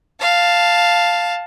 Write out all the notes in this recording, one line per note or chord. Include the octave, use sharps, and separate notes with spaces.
F5 A5